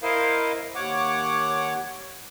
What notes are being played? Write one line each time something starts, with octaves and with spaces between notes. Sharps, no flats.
E4 A#4 C5 D#5 F5
D#2 C#5 F#5 D6